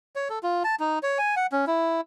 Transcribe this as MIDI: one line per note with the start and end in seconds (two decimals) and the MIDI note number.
0.16 0.28 73
0.30 0.39 69
0.43 0.63 65
0.64 0.75 81
0.80 0.99 63
1.03 1.18 73
1.18 1.35 80
1.36 1.46 78
1.52 1.65 61
1.67 2.01 64